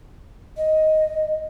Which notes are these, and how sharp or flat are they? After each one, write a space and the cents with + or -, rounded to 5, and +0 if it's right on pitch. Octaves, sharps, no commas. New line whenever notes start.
D#5 +5